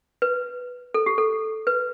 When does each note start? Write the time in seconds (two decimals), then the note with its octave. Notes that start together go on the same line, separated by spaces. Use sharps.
0.22 B4
0.94 A4
1.06 G4
1.18 A4
1.67 B4